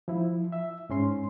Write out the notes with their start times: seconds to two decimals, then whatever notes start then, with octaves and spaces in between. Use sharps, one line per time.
0.08 F3 E4
0.52 E5
0.90 G#2 C#4 C6